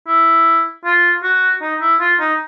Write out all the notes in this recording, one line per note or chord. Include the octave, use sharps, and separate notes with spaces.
E4
F4
F#4
D#4
E4
F4
D#4